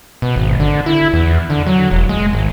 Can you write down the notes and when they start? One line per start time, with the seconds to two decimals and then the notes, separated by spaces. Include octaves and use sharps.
0.22 B2
0.36 G#1
0.60 D3
0.86 E4
1.13 E2
1.50 D3
1.67 F#3
1.91 E1
2.09 G#3
2.33 G#1